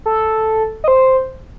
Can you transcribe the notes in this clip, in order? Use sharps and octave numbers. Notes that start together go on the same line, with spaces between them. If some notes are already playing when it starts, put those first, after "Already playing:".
A4
D#5
C5